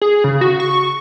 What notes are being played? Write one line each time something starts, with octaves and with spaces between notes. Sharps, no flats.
G#4
C#3
F#4
C#6